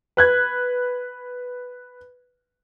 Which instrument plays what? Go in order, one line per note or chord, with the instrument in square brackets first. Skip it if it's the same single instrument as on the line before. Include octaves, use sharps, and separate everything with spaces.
[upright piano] B4 F#6 G#6